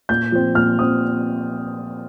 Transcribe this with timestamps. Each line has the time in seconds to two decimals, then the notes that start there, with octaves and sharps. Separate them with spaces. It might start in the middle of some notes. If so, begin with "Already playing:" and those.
0.09 A#2 G6
0.32 F3 C4
0.55 A#2 F6
0.78 F3 C4 D#6